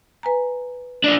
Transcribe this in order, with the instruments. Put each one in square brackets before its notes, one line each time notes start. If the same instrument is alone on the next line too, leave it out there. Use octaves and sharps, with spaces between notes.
[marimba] B4 G#5 A#5
[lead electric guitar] D4 F4